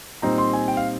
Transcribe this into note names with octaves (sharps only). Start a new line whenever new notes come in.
A#2 G3 C4 D#4 A#5
C6
G#5
G5
F5